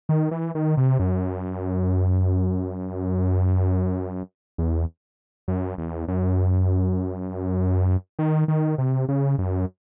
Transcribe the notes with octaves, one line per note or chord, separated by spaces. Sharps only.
D#3
E3
D#3
C3
F#2
E2
F#2
E2
F#2
D#3
D#3
C3
C#3
F#2